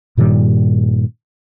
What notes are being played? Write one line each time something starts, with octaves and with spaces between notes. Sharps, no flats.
G2 A#2 D#3 G3